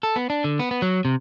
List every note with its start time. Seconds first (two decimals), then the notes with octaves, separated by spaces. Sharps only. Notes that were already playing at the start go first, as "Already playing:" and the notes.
0.03 A4
0.16 B3
0.30 D4
0.44 D3
0.59 B3
0.71 B3
0.82 F#3
1.05 C3